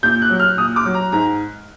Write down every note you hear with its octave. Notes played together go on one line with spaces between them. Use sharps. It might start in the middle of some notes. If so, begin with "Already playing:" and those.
A#2 G6
F#6
F#3
F6
A#2 D#6
D6
F#3
A#5
G#2 A#5